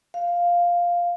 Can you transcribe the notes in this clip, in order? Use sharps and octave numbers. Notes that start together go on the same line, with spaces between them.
F5